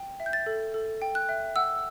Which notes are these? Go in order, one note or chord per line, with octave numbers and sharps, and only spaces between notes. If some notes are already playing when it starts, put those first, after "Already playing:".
Already playing: G5
E5
G6
A6
A4
A4
G5
F#6
E5
F#5 E6